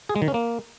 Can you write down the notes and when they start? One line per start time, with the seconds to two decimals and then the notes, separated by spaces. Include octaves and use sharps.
0.09 G#4
0.16 G#3
0.22 D#3
0.28 C#4
0.34 A#3